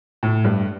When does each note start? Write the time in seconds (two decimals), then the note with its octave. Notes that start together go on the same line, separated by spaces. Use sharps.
0.23 A2
0.44 G2